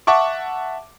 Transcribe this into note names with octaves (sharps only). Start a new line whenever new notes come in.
E5 F#5 A5 C#6 D6